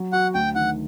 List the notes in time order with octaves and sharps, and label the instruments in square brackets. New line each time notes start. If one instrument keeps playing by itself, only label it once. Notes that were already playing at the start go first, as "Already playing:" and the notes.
Already playing: [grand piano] F#3
[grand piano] F#4 [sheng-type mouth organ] F#5
[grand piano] D2 [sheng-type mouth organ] G5
[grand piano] D#3 [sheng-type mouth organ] F#5